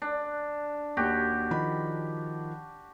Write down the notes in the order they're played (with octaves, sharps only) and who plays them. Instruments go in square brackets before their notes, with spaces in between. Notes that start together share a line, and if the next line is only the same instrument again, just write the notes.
[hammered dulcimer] D4
[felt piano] D#2 [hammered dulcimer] F#4 G4
[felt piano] D#3 F3 B5